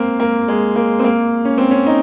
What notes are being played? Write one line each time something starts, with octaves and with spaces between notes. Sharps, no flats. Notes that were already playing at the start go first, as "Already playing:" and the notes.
Already playing: A#3 C4
A#3
G#3
A#3
C4
A#3
C#4
C4
C#4
D#4